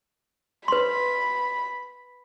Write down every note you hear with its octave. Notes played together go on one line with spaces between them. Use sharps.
B4 B5 C6